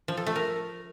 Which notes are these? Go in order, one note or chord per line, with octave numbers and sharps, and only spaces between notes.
F3
A4
A3
A#4